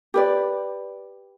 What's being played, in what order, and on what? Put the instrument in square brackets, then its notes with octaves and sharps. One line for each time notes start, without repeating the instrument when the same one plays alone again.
[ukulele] G4 B4 D5